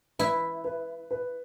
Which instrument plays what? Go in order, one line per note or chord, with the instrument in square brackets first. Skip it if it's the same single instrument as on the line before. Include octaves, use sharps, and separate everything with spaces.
[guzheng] E4 [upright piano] B4
[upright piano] B4
B4